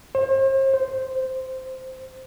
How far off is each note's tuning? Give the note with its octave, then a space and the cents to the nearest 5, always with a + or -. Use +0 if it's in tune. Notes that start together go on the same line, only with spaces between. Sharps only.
C5 +40
C5 -10